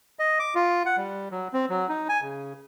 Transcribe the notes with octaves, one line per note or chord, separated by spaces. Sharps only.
D#5
D6
F4
F#5
G3
F#3
C4
F#3
D#4
G#5
C#3